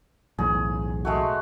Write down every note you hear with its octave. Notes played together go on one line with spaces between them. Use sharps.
B1 E2 A2 G#4
G#3 A3 F#4